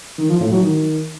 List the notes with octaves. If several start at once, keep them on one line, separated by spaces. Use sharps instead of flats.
D#3
F3
A2
F#3
D#3